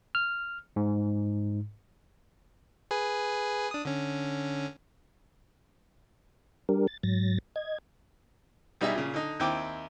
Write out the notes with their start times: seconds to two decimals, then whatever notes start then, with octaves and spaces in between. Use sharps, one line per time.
0.15 F6
0.76 G#2
2.91 G#4 B4 G#5
3.71 D4 D#6
3.85 D3 C#4
6.69 G3 D4 G4 A#4
6.87 A6
7.03 G#2 F#3 A6 A#6
7.56 D#5 G#6
8.81 B1 G3 D#4 G#4 E5 E6
8.95 A#2 C#3
9.14 D3 D#4
9.40 D#2 C4 E4 G5 D6